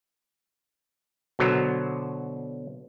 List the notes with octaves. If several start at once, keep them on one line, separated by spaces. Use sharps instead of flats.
B2 D3 F#3 C5 A#5